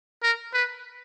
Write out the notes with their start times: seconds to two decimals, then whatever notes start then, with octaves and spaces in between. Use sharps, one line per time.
0.23 A#4
0.54 B4